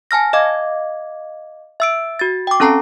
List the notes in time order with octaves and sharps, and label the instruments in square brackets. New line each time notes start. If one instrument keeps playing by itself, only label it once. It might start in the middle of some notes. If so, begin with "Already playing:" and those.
[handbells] G#5 A5 F6 A#6
D#5 F5 D6 G#6
E5 E6 D7
F#4 A6
G5 D6
C4 C#4 A4 A5 A#5 C7